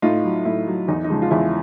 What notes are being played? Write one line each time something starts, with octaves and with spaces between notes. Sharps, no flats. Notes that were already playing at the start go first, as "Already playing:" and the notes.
A2 D#4 F4
F#3
A2 E4
F#3
E2 D#4
D#4
C#3 F3 G#3
F4
E2 E4